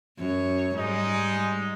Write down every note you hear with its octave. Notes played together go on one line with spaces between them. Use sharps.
F#2 C#5
G#2 G3 G#3 D#4